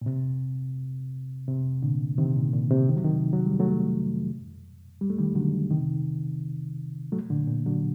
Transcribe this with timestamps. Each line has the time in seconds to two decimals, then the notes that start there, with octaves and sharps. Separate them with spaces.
0.02 A#2
0.06 C3
1.48 C3
1.82 A#2 D3
2.18 C3 D#3
2.36 A#2
2.53 A#2
2.71 C3
2.89 D#3
2.97 F#3
3.04 C3 D#3
3.33 F#3
3.46 G3
3.60 F#3 A3
5.01 G3
5.10 A3
5.19 D#3 G3
5.35 D3 F#3
5.71 C3 D#3
7.12 F#3 A3
7.30 A#2 D3
7.47 A#2
7.66 D3 F#3